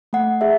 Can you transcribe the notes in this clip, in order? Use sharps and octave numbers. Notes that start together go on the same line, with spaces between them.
A3 F#5
G#4 E5